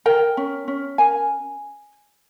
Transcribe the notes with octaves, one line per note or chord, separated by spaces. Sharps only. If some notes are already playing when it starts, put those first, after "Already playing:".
A#4 G5
C#4
C#4
A#4 G#5